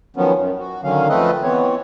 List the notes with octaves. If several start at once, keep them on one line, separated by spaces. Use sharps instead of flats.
D#3 F3 F#3 B3 C#4
F#2
F#4
D3 D#3 F#3 C#4 F5
F2 A3 C4 A4 B4 D#5
E3 B3 C4 C#5